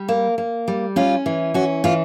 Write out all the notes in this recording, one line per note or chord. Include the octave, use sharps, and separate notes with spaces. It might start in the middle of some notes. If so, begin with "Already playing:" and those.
Already playing: G3
A#3
A#3
G3
C#4 F4
E3
C#4 F#4
E3 F4